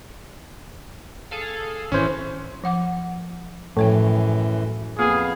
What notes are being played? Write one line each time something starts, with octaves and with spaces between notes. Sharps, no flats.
G#4 A4 F5
G#1 E3 C#4 C5
F3 F#5 D6
F#2 A2 E3 F3 C#5 G5
F2 A#3 B3 F4 G#4 F5